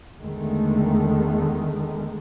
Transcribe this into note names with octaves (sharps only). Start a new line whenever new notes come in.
E2 D3 D#3 G#3 A3